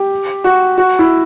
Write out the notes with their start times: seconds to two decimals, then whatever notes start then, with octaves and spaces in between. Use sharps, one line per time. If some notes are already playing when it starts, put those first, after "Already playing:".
Already playing: G4
0.44 F#4
0.78 F#4
0.99 E4